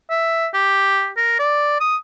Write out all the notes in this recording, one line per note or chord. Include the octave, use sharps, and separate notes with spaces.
E5
G4
A#4
D5
D#6